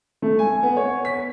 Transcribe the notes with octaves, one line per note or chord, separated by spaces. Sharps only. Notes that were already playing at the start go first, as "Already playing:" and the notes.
A3
G#5
B3
C#5
B6